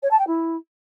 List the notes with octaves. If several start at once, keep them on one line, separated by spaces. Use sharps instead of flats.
C#5
A5
G5
E4